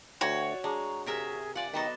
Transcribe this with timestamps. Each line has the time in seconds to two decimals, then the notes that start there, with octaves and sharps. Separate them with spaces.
0.21 D2 F#4 C#5 G5 G#6
0.49 D5
0.64 G#3 D4 A#5
1.06 C3 G#4 A#4 E5
1.55 F4 D5 F#5 G#5
1.74 D#3 F#3 B3 A4 D#5